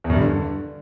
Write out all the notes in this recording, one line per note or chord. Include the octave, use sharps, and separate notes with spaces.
E2
F#2
G2
D3